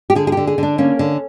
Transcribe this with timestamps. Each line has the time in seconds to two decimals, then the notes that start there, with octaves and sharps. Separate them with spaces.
0.10 G4
0.15 D3 G#4
0.27 G#4
0.32 D3 G4
0.47 G#4
0.58 D3 D4
0.78 A#3 C#4
0.99 D3